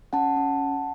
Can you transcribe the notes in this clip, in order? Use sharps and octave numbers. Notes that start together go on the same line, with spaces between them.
C#4 F#5 A5
C#4